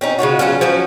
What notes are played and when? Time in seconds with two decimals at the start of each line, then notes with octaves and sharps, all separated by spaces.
0.01 C4 C#4 D#4
0.19 C#3 G#3 F4 F#4
0.39 F#3 A3 C#4 F4
0.61 F3 F#3 C#4 F#4